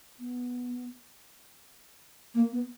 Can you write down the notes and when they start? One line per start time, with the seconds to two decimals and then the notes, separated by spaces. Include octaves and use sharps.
0.20 B3
2.34 A#3
2.52 B3